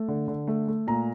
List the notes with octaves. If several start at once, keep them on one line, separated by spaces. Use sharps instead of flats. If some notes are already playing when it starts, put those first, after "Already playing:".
Already playing: A3
D3
D3
A3
A3
A#2 A#5